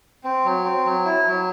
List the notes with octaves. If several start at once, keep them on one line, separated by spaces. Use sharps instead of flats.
C4
F#3
C4
F#3
E4
F#3